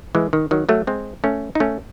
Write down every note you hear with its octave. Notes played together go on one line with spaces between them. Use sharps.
E3 G#3
D#3
D#3 F#3
F#3 A3
G#3 C4
A3 C#4
D#4
A3 C#4